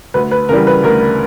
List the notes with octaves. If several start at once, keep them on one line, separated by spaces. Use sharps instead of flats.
D2 B4
B4
C#3 E3 G3 A#4
B4
D2 A#4